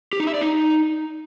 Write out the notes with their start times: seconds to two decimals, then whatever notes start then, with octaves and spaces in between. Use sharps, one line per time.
0.13 G4
0.20 D#4
0.27 E5
0.34 D5
0.41 D#4